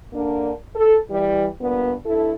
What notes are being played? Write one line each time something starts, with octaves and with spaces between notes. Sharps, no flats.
D3 A#3 D4
A4
E3 G3
G2 A#2 B3
G2 E4 A4